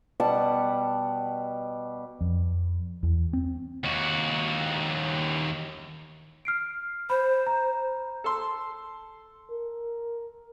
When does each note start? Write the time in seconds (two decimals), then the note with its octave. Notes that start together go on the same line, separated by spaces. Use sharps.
0.20 B2 G3 F#5 A5
2.21 F2
3.03 E2
3.33 C4
3.84 D#2 F#4
6.45 F6 C7 D7
7.10 C5 B5
7.47 A#5
8.24 A4 C6
9.51 A#4